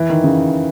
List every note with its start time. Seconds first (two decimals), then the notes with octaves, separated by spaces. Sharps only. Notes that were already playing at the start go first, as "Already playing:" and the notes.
Already playing: E3
0.09 D#3
0.23 C#3